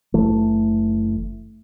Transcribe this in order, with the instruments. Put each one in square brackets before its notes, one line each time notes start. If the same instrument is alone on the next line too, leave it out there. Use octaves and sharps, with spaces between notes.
[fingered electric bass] F#1 E3 A3